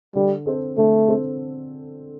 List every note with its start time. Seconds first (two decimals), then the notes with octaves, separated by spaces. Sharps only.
0.15 D3 G3
0.46 C4 A4 C5
0.77 D3 A3
1.08 C4 A4 C5